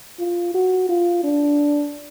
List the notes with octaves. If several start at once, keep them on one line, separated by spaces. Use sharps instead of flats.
F4
F#4
F4
D4